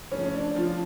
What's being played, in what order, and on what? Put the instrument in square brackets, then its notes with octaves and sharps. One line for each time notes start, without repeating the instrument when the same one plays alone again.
[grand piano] C#3 F3 A3 C#4
D4
F3 F4